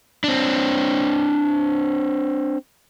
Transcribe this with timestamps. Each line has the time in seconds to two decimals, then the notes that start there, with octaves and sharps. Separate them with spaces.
0.24 C4 D4